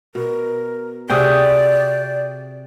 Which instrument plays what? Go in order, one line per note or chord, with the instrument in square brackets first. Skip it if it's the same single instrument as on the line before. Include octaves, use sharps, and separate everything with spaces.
[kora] B2 [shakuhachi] A#4
[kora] C3 F#4 G#4 [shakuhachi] D5 [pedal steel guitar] G5 D#6